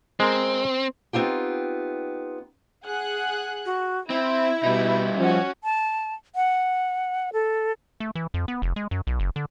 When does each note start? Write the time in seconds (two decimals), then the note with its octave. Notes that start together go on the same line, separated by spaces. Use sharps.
0.20 G#3 C4 A#4
1.13 B3 C4 D#4 F4 G4
2.85 G#4 F#5 F#6
3.66 F#4
4.10 C4 E4 E5
4.63 B2 G3 D#4
5.19 F3 C#4 F#4
5.64 A5
6.35 F#5
7.33 A4
8.00 A3
8.15 E3
8.34 F2
8.48 B3
8.62 F1
8.76 G#3
8.91 F#2
9.07 B1
9.20 F#1
9.36 D3